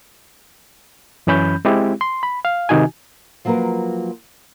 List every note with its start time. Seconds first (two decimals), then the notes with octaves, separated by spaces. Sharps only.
1.27 F#2 E3 C#4 B5 G6
1.65 G#3 C4 E4 G4
2.01 C6
2.23 B5
2.45 F5
2.69 C3 D#3 D#4 F#4 G#5
3.45 F3 F#3 A#3 F4 A#4 B4